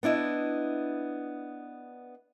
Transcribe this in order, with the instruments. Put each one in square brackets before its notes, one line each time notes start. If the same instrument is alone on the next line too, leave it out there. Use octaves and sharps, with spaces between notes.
[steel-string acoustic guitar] B3 D4 E4 D#5